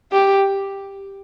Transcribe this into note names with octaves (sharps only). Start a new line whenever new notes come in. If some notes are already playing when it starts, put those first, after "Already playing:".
G4